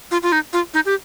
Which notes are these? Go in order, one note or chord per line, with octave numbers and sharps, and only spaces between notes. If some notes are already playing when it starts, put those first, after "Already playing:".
F4
F4
D#4
F4
D#4
G4